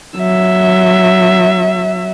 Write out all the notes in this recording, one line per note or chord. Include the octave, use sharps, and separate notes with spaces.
F#3 E5